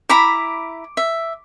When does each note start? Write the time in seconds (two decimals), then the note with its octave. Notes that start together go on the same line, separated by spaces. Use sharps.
0.09 E4 A#5 B5 D6
0.97 E5